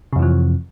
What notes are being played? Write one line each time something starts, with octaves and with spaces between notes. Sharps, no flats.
F2 C3 E3 F3